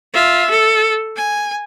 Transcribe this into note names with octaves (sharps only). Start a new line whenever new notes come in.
F4 E5
A4
G#5